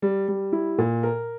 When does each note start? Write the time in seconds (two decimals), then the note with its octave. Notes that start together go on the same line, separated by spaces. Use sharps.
0.02 G3
0.28 G3
0.53 E4
0.78 A#2
1.03 A#4